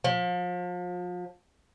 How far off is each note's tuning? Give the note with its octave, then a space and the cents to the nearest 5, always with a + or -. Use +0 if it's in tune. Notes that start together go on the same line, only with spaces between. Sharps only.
F3 +35